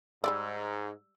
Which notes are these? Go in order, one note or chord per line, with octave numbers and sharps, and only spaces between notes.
G#2 G3 G#3 D5 E6